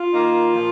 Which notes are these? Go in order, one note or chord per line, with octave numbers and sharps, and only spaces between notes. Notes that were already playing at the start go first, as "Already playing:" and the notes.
Already playing: F4
D#3 A#3 D#4
A#2 F3